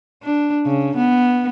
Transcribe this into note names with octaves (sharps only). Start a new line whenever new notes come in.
D4
C#3
B3